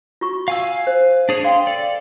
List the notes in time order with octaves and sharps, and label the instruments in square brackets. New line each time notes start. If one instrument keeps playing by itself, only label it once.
[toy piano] F4 F#4 C#6
[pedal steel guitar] F5 G#5 E6
[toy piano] C5
[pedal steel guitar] D4 G#4 C#5
[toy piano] F5 G5 [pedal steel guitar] C6
[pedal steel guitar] A4 D5